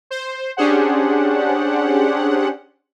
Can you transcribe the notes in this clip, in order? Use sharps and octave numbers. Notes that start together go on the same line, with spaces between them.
C5
C#4 D4 G4 G#4 C5 F#5